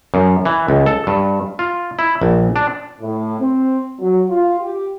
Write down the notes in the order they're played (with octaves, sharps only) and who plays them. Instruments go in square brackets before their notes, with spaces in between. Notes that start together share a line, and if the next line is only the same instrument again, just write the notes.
[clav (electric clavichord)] F#2
E3
C#2
A4
G2
F4
E4
A#1
D4
[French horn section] A2
C4
F#3
F4
G4